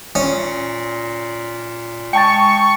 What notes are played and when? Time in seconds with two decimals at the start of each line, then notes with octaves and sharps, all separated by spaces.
0.15 A#2 C#4
2.13 G#3 G5 A5 C#6 A6